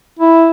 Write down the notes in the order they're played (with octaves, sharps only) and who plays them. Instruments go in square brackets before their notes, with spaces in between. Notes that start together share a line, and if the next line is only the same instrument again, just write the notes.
[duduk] E4